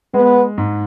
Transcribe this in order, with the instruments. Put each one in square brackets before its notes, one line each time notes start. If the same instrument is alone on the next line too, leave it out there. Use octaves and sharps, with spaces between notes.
[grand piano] G#3 [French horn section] B3
[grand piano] G#2